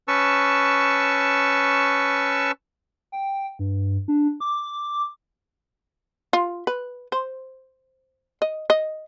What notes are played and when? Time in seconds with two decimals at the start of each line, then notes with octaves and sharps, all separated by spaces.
0.08 C#4 B4 A5 C#6 E6
3.12 G5
3.59 G2
4.08 D4
4.40 D6
6.33 F4
6.67 B4
7.12 C5
8.42 D#5
8.70 D#5